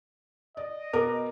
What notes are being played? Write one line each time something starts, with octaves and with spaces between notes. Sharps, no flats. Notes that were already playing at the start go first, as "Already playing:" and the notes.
D5 D#5
B2 A#4 D6